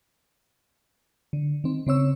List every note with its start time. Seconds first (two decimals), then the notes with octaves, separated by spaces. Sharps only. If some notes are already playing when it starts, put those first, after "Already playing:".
1.33 D3
1.64 D#3 C4
1.87 C#3 C4 C#5 E6